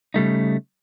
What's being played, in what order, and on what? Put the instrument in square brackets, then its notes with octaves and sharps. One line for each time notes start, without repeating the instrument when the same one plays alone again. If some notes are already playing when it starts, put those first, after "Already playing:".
[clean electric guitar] C#3 G3 A3 D#4